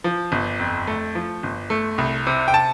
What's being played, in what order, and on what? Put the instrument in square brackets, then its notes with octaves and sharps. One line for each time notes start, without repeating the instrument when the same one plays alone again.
[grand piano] F3
G1
F2
A3
F3
G1
A3
C2
C3
G5
A5